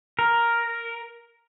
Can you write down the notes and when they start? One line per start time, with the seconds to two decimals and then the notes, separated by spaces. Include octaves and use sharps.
0.19 A#4